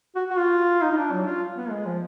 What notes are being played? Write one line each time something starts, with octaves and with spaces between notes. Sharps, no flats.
F#4
F#4
F4
D#4
D#4
D4
F#3
F4
B3
G#3
F3